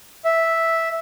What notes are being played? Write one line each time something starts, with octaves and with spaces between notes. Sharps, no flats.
E5